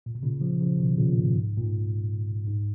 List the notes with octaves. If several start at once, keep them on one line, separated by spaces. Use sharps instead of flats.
A#2
B2
A#2 C#3
C#3 F3
C#3 F3
B2 D#3
A#2 C#3
A#2
G#2
G#2
A#2
G#2
G#2